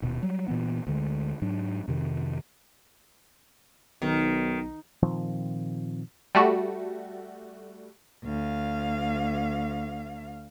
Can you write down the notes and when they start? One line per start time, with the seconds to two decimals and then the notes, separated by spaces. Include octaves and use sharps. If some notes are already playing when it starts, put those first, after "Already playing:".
0.02 D#1 B2
0.23 F#3 G3
0.48 A#2 E3 B3
0.87 D2 D3 G#3
1.42 G#2 F#3 D4
1.88 F2 C3 D#3
4.02 B1 D#3
5.02 A#2 D#3 F3 C4
6.35 G3 A3 F#4
8.25 D2 F5